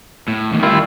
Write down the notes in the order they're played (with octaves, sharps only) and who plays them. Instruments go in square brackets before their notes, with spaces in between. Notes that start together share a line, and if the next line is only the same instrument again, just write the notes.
[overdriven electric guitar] A2
E2 D#3
[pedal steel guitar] G3 E4 F4 [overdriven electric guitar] A#4 E5